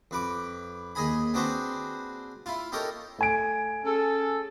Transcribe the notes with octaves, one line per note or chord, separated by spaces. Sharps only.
F2 B4 D6
D#2 G#4 D#5 G#5 B5
C4 D4 F#4 G#4 B4 C5
E4 F4
D#4 G4 A4 A#4 C#5
A3 G#5 D7
C#4 G#4 A4